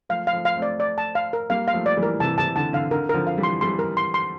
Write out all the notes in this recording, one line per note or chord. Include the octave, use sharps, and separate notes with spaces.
F3 A3 F5
F5
F3 A3
F5
A3 C4
D5
D5
A5
F5
A#4
G3 A#3 F5
F5
F3 A3
D5
E3 G3
A#4
C3 E3 A5
C3 E3 A5
D3 A5
D3 F5
D3 A#4
D3 F3 A#4
F5
E3 G3
C6
E3 G3 C6
A#4
C6
C6